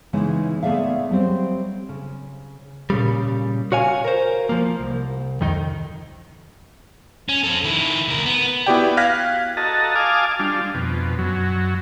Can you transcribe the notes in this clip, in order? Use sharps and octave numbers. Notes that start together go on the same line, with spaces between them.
C#3 E3 G#3 B3 D#4
A3 B3 G#4 D5 E5 F5
F#3 G3 C4
C#3
A#2 C#3 G3
F#4 C#5 F5 G#5
A#4 C5
F3 A#3
C2
F2 D#3 D#4
C#4
C4 A4
D#3 E4
C#2 A#4
B3
B3 E4 F#4 G4 D5 G5
F5 F6 F#6 G#6 A#6 B6
F#4 A4 D#5 A5 A#5
F5 G#5 A5 D6 D#6 F6
G3 D4 F4
F2 B2
F#2 F#3